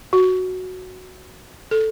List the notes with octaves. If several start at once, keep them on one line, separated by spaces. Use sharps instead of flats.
F#4
A4